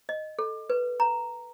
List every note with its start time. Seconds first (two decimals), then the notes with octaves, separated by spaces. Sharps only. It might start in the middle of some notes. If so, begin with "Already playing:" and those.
0.09 D#5
0.39 A4
0.70 B4
1.00 A#5